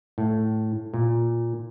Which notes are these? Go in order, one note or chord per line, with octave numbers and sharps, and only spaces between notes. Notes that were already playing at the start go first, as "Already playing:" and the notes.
A2
A#2